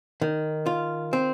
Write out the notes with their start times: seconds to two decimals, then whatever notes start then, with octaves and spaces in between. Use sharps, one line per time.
0.22 D#3
0.66 F4
1.13 C4